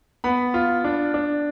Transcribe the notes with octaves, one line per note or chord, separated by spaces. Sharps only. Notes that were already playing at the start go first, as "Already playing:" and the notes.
B3 B5
F4
D4
D4